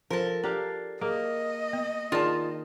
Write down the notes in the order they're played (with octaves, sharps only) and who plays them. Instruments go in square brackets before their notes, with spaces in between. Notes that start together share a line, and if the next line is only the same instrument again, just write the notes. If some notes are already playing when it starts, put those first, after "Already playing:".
[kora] F3 [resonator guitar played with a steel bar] A4 A#4
[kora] D4 G4 F5 [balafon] A#5
[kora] A#3 [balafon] G#4 [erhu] D#5
[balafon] B3
[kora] D#3 [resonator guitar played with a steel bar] F4 A5 [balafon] G#4 D5